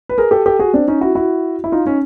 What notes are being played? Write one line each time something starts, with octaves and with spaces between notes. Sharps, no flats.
B4
G#4 A#4
G4 A4
G4 A4
F#4 G#4
C4 D4
C#4 D#4
E4 F#4
E4 F#4
E4
D#4 F4
C#4 D#4